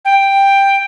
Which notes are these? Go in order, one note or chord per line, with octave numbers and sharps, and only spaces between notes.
G5